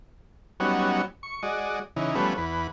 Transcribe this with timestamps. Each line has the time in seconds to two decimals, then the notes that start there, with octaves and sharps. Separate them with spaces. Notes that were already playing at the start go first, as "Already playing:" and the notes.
0.60 F#3 G3 B3 C#4 D#4 F#4
1.23 C#6
1.43 G#3 F#4 D5 D#5
1.96 C#3 E3 D#4
2.15 F3 G3 A3 B3 C#4 B4
2.38 E2 B4